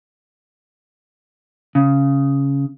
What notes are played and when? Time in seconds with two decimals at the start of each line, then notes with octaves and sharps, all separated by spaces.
1.75 C#3